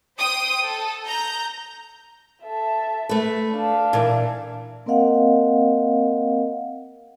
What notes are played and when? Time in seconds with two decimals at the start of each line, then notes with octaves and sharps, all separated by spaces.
0.19 C5 G5 D#6
0.63 A4
1.06 A#5 G6
2.44 A4 E5
3.09 A3 B4
3.53 D4 F5
3.93 A#2 E3
4.86 A#3 C4 A#4 D#5 F5 F#5